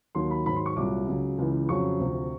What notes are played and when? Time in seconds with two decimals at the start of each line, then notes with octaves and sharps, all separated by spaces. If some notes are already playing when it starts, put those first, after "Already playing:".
0.15 D#2 D#3 F#3 C6
0.31 B5
0.46 G#2 D#3 F#3 B5
0.56 C6
0.66 C#6
0.76 C2 A#2 F#3 D6
1.07 C#2 C#3 F#3
1.38 C#2 C#3 E3
1.69 F2 C#3 F#3 C#6
2.00 D2 C3 F3